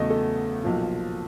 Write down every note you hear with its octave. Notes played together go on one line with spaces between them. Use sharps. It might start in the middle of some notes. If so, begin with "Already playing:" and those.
Already playing: E2 C#3 F#3 A3 D#5
A4
B1 A#2 F3